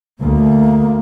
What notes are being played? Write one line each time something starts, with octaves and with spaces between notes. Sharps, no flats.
D2 A#3